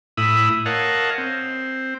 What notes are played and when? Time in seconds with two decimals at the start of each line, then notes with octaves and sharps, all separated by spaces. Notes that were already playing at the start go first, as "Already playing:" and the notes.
0.17 A2 E4 E5 B5 D#6
0.66 A#4 C#5 D#5 F5 F#5 A5
1.18 C4